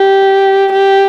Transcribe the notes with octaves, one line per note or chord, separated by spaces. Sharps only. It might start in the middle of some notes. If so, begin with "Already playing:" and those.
Already playing: G4
G4